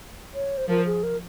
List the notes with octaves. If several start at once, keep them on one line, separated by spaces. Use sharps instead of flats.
C#5
C5
F3 A#4
G#4
A#4